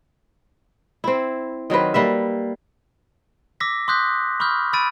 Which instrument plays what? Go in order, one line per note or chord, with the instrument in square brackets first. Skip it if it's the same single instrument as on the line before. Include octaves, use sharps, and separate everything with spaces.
[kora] C4 E4
D#3 F#3 C4 B4
G3 A#3 B4 E5
[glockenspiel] D6 E6 A#6 B6
C6 D6 D#6 F#6 G6 B6
B5 C#6 D#6 F6 G6
B5 E6 A6 D7 D#7